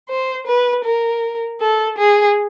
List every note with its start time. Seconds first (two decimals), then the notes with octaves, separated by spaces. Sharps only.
0.09 C5
0.47 B4
0.85 A#4
1.60 A4
1.98 G#4